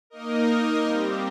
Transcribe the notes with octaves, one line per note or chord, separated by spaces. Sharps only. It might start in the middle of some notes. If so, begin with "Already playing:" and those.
A#3 D#4 A#4 D#5
G3 C4 G4